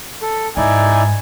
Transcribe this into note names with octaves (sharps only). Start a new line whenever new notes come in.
A4
G#2 D#4 E4 D5 G#5